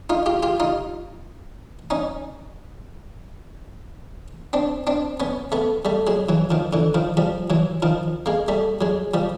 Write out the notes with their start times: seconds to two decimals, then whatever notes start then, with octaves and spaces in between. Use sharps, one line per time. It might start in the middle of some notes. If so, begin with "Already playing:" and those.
0.10 D#4 F4
0.26 F4 G4
0.43 F4 G4
0.60 D#4 F4
1.90 C#4 D#4
4.53 C4 D4
4.87 C4 D4
5.20 B3 C#4
5.52 A3 B3
5.85 G3 A3
6.07 F#3 G#3
6.29 E3 F#3
6.51 D#3 F3
6.73 D3 E3
6.94 D#3 F3
7.17 F3 G3
7.50 E3 F#3
7.82 D#3 F3
8.26 G#3 A#3
8.48 G3 A3
8.81 F#3 G#3
9.14 F3 G3